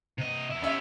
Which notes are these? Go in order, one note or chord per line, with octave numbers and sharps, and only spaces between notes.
C3 D#5
E2 E4
B3 C#4 G4 E5